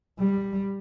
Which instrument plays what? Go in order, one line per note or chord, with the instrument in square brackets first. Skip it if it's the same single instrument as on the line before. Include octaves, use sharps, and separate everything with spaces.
[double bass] G3